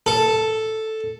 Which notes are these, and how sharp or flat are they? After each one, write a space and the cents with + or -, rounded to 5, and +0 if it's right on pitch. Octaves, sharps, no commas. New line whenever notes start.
A4 +0